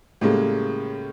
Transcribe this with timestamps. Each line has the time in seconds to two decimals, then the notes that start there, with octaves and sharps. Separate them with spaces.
0.21 A2 C#3 G3 G#3 A#3